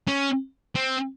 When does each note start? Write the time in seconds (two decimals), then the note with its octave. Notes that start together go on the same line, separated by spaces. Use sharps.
0.08 C#4
0.76 C4